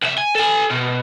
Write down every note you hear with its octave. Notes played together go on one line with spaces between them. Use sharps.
C2 E5
G#5
A4 G#5
B2